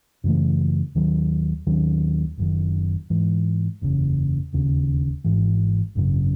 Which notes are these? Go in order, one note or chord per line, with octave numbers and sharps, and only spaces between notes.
F#2 C#3 E3 A3
D#2 D#3 F#3
D#2 D#3 F#3 C#4
F#1 F#2 D#3
G#2 E3 G#3
F#1 E2 C#3
E1 D#2 C#3
G#1 G#2 E3
G#1 F#2 C#3